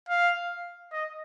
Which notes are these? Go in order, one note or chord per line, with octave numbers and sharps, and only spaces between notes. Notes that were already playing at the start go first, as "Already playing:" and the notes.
F5
D#5